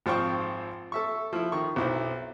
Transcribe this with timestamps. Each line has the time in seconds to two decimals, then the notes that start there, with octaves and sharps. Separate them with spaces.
0.06 G#1 F3 C4 F5 G5 C#6
0.92 A4 E5 C#6
1.33 F3 E4
1.52 D#3 C#6
1.76 B1 E4 C5